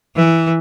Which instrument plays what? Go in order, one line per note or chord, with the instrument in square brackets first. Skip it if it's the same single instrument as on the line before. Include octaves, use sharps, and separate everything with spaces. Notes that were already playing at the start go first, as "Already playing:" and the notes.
[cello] E3